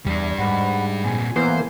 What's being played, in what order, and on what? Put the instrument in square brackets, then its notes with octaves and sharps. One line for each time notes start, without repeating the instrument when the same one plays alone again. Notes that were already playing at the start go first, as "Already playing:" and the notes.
[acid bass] E2 [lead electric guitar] G3 D4
[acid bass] G#2 [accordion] F#5 B5
[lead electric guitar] A#2 C4 [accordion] G#5
[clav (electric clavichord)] E3 B3 [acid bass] A#3 [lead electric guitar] C5